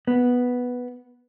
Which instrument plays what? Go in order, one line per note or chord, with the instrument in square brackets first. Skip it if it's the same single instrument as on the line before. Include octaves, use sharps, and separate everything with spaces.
[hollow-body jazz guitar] B3